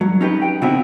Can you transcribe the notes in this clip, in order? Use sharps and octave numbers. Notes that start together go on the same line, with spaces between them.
G2 F#3
C#4 D#4 G4 B4
G5
B2 D3 C4 C#4 E4 F#4